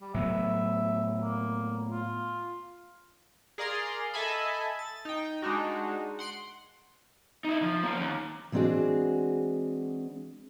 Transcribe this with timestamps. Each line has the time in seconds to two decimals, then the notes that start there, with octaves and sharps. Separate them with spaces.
0.01 G3
0.14 A2 F#3 B3 E5
1.20 A#3
1.91 F4
3.58 G#4 A#4 D5 F5 A#5 C6
4.14 A4 D#5 E5 G#5 A5 B5
4.79 A6
5.05 D#4 G5
5.42 G#3 D4 D#4 F#4
6.19 F#5 C6 D7
7.45 D#4 E4
7.62 F3
7.83 A#3 C#4
8.00 D#2
8.52 E3 G#3 C4 D4 F#4 G#4